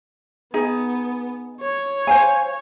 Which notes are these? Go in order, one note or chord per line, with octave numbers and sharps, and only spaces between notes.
B3 D#4 G#4
C#5
C5 F5 G#5